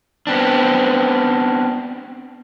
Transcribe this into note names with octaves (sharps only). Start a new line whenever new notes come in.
B3 C4 D4